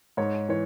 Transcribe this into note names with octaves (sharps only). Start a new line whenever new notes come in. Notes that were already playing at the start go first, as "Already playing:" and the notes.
G#2 C#5
E3 C#5